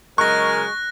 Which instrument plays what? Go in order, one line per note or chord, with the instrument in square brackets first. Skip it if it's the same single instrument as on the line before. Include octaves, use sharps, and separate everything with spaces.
[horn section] C#3 F#3 G#3 [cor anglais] A#4 [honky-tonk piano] C#6 [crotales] F#6 A#6